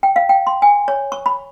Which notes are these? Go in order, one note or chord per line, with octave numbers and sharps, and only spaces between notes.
G5
F5
G5
C6
G#5
C#5
C#6
B5